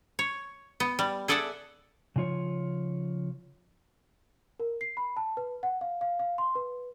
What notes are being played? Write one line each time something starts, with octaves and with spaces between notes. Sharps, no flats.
C#5
B3
G3
G#4 A4 D5 E5 F#5 A5
C#3 F3 F4 C#5
A#4
C7
B5
A5
B4
F#5
F5
F5
F5
C6
B4